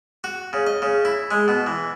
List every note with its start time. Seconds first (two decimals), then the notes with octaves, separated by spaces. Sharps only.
0.24 F#4
0.53 C#3
0.67 D#5
0.82 C#3
1.05 E4
1.31 G#3
1.48 B2
1.67 E3